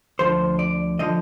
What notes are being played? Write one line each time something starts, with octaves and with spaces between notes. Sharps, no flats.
D2 D3 F3 C5
D5
D3 F3 D#5